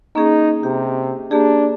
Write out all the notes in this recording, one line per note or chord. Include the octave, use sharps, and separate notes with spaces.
A#3 C#4 D#4 G#4
C3 G4
A#3 D4 G4 G#4